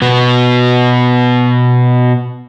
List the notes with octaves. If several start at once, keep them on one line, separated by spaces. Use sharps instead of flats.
B2 B3